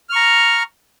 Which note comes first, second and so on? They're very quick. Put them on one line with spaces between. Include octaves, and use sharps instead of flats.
F6 C#6 A#5